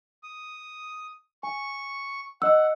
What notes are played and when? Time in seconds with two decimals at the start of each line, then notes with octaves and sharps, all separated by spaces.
0.23 D#6
1.43 G#5 C#6
2.42 D#5 F#5 E6